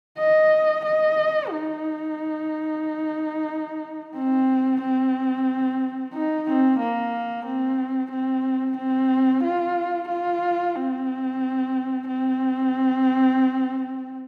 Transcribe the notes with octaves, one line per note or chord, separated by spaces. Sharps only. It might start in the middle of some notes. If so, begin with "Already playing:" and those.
D#5
D#5
D#4
C4
C4
D#4
C4
A#3
C4
C4
C4
F4
F4
C4
C4